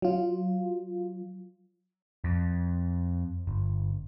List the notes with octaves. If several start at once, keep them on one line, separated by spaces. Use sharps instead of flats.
F#3 F4
F2
G1